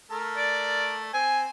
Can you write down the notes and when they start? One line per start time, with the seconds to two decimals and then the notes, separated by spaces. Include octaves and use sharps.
0.11 A3 A#4
0.37 D5
1.14 C4 G#5